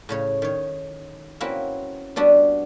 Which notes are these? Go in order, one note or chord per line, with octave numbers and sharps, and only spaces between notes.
A2 C#3 C#5
D#3 C#5
A#3 C4 C#4 E4 F#4 B4
G3 B3 D4 F#4